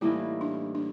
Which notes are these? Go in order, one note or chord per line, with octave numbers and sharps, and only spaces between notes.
A2 E3 G3 A#3 D#4 E4
D4
D4